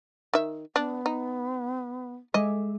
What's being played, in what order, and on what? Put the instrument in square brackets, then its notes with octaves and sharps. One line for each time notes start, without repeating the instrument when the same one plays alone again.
[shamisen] D#3 E5
[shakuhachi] B3 [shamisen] D4
[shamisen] D#4
[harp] G#3 E5 D6 [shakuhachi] A4 [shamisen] D#5